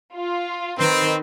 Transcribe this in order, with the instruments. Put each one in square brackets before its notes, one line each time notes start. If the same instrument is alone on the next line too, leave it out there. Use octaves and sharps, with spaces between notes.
[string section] F4
[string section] D#3 B4 [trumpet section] C4